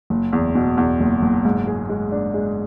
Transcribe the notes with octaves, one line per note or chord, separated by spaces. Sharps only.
F#1
E2
B2
E2
F#1
F#1
G#2
G#4
G#3
D4
G#3